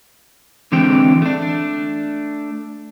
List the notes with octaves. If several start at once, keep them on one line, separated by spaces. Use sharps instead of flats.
D3 E3 G#3 C4 G5
A3 D4